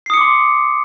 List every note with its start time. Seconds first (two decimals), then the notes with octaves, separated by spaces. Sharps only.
0.06 C7
0.10 D#6
0.14 C#7
0.17 D6
0.21 C6